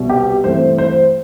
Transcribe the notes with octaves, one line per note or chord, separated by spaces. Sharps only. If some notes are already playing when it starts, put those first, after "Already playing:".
Already playing: C2 B2 G3
G4
G2 E3 A3 C4 C5
C5